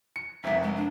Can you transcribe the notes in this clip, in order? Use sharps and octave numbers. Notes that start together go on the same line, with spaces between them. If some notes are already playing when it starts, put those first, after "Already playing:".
C#7
F1 C2 E5
G#3
D4